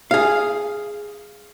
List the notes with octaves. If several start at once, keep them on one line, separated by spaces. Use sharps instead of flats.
G#4 F5